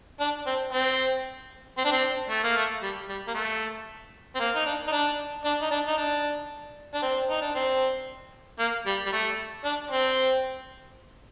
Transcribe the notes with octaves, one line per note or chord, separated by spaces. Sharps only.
D4
C4
C4
C4
D4
C4
A3
A#3
A3
G3
G3
A#3
A3
C4
A#3
D#4
D4
D#4
D4
D4
D#4
D4
D#4
D4
D4
C4
D#4
D4
C4
A#3
G3
G3
A3
D4
C4